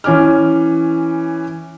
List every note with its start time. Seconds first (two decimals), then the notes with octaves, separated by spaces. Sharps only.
0.04 E3 C#4 G#5 D6 F6